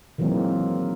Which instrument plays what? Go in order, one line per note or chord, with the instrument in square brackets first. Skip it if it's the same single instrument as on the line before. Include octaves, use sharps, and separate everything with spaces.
[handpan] D#3 E3 F#3 G#3 A#3 C4